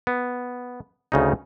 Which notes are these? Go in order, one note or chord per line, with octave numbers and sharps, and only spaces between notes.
B3
D2 C#3 D#4